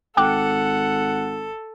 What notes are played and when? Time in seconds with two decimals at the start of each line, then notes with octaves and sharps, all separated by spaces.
0.17 G#1 A4 F#5 G5 D6 F#6